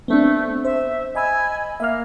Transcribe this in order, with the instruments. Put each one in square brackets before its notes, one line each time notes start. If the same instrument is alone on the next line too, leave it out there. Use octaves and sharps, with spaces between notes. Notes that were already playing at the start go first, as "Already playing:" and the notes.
[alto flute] A3 [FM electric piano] B3 C4 D4
[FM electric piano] C5 [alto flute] E5
[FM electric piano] D#5 B5 E6 [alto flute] G#5
[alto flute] A#3 [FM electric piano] E5 F6